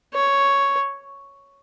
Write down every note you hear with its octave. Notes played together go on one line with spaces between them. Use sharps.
C#5